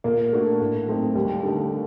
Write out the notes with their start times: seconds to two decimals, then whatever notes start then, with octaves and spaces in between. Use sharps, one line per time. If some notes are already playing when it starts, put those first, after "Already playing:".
0.04 A#2 A#3
0.33 A3 D4 F#4
0.60 A2
0.87 F#3 A3 C4 D#4
1.15 D#2 G3
1.43 D3 A3 D#4